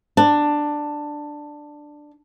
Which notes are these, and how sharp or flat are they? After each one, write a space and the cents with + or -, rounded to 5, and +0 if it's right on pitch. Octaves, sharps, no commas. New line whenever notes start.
D4 +10